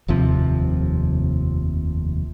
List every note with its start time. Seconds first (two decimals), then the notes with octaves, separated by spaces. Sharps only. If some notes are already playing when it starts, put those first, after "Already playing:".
0.08 F1 D#2 C3 F3